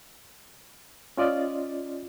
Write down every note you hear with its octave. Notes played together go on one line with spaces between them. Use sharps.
C#4 F4 D5 D#5